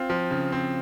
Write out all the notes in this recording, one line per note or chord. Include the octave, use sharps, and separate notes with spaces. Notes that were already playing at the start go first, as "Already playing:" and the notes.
Already playing: C4 F4
F3
C#3
C4